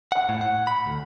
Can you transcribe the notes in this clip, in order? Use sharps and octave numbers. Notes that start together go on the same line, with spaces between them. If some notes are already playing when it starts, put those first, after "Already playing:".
F#5
A2
F#5
B5
D2